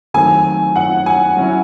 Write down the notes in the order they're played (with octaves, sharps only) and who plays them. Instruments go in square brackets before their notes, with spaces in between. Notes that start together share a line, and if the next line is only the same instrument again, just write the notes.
[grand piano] D#3 F#3 A3 C4 [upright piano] G#5
[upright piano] F#5
G#5
[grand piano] F#3 C#4 E4